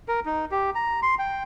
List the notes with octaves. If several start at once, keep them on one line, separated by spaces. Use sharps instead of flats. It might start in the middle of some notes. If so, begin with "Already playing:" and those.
A#4
D#4
G4
A#5
C6
G5